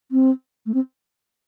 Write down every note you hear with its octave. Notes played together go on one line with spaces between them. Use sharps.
C4
A3
C4